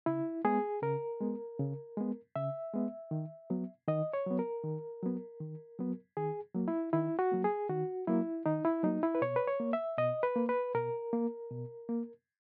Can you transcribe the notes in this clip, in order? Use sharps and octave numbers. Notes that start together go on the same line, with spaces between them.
C#3 E4
G#3 B3 G#4
C#3 A#4
G#3 B3
C#3
G#3 B3
C#3 E5
G#3 B3
D#3
F#3 B3
D#3 D#5
C#5
F#3 B3
A#4
D#3
F#3 B3
D#3
F#3 B3
D#3 G#4
F#3 A#3
E4
D#3 E4
F#4
F#3 A#3
G#4
D#3 F#4
F#3 A#3 E4
D#3 D#4
E4
F#3 A#3 D#4
E4
B4
B2 C#5
B4
C#5
A#3
E5
B2 D#5
B4
A#3
B4
B2 A#4
A#3
B2
A#3